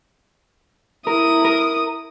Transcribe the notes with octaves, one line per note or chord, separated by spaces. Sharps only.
E4 A#4 D#6
A#4